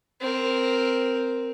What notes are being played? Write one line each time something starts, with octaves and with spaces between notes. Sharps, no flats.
C4 A#4